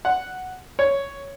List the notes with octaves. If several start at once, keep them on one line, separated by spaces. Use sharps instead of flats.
F#5
C#5